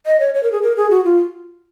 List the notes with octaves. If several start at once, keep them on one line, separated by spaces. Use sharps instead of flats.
D#5
C#5
C#5
A#4
G#4
A#4
G#4
F#4
F4